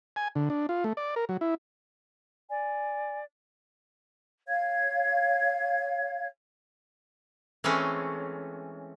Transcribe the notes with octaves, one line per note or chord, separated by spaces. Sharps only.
G#5
D3
D4
F4
A3
D5
A#4
F#3
E4
D5 G#5
C#5 F5 G#6
E3 G#3 A3 C4 C#4